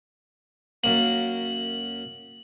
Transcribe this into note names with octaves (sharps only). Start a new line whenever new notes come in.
F#2 A#3 F#7